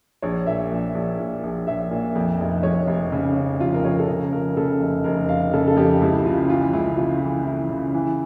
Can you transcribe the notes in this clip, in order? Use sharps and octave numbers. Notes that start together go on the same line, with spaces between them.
A#1 C#5
A#2 E5
A#1
A#1
A#2
A#1
A#1 E5
A#2
F2
F1
F2 C#5
F1
C#3
C#3
F1 F4
A#4
F2 C#5
A4
C#3 A#4
F1 A#4
C#3 A4
F1
F1 A#4
F1 F5
C#3 A4
A4
F2 G4
C#2 E4
C#3 F4
E3 F4
C#2 E4
C#3 F4
E3
E3 E4
C#3
E3